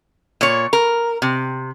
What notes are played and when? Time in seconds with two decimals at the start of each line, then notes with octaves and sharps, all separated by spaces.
0.41 A#2 C#5
0.73 A#4
1.22 C3